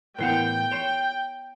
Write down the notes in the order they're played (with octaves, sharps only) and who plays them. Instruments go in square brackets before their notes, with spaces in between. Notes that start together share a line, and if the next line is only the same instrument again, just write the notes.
[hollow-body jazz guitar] A2 E3 F#5 [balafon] B3 E4 A#4 [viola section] G5
[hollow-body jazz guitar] C#5 C6